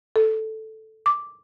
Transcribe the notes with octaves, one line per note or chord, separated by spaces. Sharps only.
A4
D6